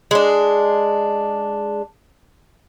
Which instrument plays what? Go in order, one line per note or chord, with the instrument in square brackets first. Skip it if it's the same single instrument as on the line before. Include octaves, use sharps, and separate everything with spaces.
[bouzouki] G#3 D4